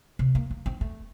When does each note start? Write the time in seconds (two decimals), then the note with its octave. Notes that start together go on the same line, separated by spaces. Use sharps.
0.19 C3
0.35 A#3
0.51 A#3
0.66 C4
0.81 A3